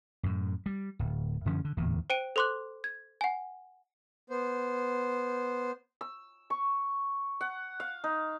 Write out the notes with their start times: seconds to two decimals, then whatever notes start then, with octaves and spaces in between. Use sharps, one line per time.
0.23 F#2 A2
0.66 G3
0.99 D1
1.45 F#2 D3 F3 C#4
1.65 D3
1.77 D1 E2 A#2
2.10 C5 G5 D7 D#7
2.36 A4 C5 C6 D6 F#6
2.84 G#6
3.21 F#5 G#5
4.30 B3 C5
6.01 E6
6.50 C#6
7.41 F#5
7.80 F5
8.04 D#4